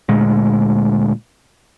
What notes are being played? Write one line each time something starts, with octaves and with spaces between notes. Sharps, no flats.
D2 A#2 G#3